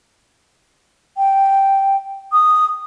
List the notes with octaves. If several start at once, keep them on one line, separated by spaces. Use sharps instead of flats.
G5
D#6